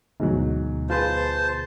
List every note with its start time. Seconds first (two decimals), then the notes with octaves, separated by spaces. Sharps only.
0.20 D2 G#2 B2 F#3
0.90 F4 G#4 B4 C5 A5